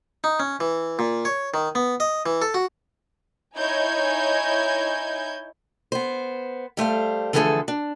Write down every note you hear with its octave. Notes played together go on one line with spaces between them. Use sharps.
D#4
C#4
E3
A#2
C#5
D#3
B3
D#5
E3
A4
F#4
D#4 E4 C#5 G#5 G6 G#6
B3 C5
G3 A3 C5 F5
D3 E3 F3 A3 G#4 A4
D4